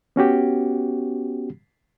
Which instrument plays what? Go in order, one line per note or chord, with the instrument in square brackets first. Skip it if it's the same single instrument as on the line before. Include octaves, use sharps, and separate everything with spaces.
[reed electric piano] B3 C#4 F#4 G4